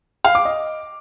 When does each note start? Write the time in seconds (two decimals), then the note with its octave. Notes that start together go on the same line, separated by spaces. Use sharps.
0.25 F5
0.35 D6
0.45 D#5